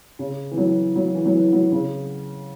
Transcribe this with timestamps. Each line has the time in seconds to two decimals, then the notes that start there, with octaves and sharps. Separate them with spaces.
0.19 C#3
0.51 E3
0.57 F#3
0.96 F#3
1.15 E3
1.25 F#3
1.34 E3
1.53 F#3
1.72 C#3